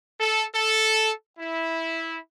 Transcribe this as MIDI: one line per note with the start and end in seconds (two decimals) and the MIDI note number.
0.20 0.43 69
0.53 1.11 69
1.39 2.17 64